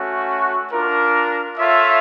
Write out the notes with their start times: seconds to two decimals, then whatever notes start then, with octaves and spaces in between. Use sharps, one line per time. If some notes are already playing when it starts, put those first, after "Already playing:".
Already playing: A3 C#4 F#4
0.72 D4 F4 A#4
1.58 F4 A4 C#5 E5